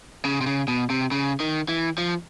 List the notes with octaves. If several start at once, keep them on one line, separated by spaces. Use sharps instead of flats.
C#3
C3
C#3
B2
C3
C#3
D#3
E3
F3